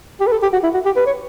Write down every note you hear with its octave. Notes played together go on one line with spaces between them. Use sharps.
G4
B4
A4
G4
F#4
E4
F#4
G4
B4
C#5